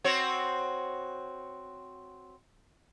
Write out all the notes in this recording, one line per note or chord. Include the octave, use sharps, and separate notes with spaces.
C4 F#4 C#5